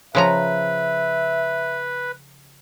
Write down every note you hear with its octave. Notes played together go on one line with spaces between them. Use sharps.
C#3 F3 B4 E5 A#5